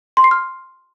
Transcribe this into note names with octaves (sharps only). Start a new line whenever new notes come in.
C6
C7
F6